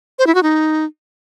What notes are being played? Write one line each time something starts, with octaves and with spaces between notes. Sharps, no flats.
C5
E4
F#4
D#4